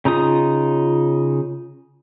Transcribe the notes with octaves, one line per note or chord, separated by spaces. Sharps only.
C#3 D#4 F4 D#6